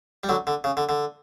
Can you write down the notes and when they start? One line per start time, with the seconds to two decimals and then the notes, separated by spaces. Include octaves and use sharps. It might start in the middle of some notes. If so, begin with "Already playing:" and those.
0.23 G3
0.29 D3 F#3
0.47 D3
0.64 C#3
0.77 D3
0.89 D3